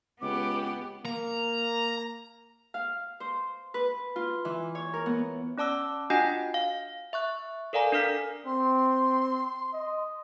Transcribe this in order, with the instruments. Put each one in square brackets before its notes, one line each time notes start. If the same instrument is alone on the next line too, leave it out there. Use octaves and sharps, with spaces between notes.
[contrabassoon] C#2 [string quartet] B3 G4 [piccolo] D6
[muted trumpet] A#3 [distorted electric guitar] A#5
[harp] F5
C5
B4
F4
E3
C#5
A#4
B3
[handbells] C#4 D5 A5 D6 E6
D4 F4 F#4 D#5 F#5 G#5
F5
E5 C#6 F#6
A4 A#4 D5 F5 G#5 A#5
D4 A4 A#4 F5 F6 B6
[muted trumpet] C4 [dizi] C6
[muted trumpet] D#5